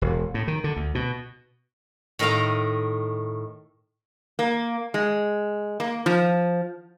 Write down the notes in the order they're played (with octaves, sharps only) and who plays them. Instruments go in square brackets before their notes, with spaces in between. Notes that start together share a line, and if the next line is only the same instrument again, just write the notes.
[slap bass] E1
A2
D#3
D3
D2
B2
[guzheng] A2 D#3 A#4 D#5 F5 A#5
[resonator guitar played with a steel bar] A#3
G#3
A#3
F3